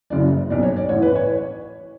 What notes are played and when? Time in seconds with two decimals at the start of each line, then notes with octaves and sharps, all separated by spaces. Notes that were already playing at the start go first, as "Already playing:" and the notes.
0.10 F#1 F#2 C#3 E3 D5
0.50 B1 B2 D5
0.63 C#5
0.77 D5
0.89 A1 A2 E3 C#5
1.02 B4
1.16 C#5